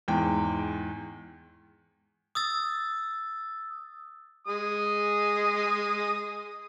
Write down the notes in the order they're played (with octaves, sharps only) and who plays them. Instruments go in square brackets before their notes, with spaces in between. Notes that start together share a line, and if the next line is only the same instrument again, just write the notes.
[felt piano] E2 G#2 G5
[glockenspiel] D#6 E6 A6
[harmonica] G#3 D#6